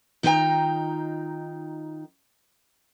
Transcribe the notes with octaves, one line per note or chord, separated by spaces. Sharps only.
D#3 D#4 F4 B4 G5 A#5